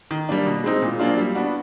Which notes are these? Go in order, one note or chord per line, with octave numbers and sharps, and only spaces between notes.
D#3
G3 A#3 D4
B2
G#3 C4 D#4
A#2
F#3 A#3 D4 F4
G3
B3 D4 F#4